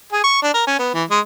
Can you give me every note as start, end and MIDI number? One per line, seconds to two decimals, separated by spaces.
0.13 0.24 68
0.24 0.41 85
0.42 0.54 62
0.54 0.62 70
0.67 0.78 61
0.79 0.92 59
0.94 1.04 52
1.10 1.20 56